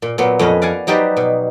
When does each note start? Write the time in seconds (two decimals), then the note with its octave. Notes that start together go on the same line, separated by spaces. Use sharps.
0.02 A#2
0.18 A#2 F#3 B3
0.39 F2 C#4 B4 D#5
0.62 D5 F5 F#5 G#5
0.87 F#3 D#4 G4 B4 C5 D5
1.17 B2